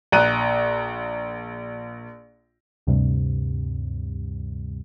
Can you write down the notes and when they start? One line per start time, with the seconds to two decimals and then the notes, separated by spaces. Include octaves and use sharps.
0.12 A#1 A#5 F#6 D#7
2.87 D2 G2 C3 G3